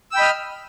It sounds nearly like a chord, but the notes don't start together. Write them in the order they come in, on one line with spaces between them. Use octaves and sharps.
E6 G5 B5 D#5 F6